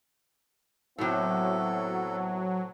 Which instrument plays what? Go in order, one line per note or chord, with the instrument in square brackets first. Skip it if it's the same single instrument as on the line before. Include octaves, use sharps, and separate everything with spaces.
[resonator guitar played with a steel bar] A2 C3 [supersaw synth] F#3 [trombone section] B3 E4 [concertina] A4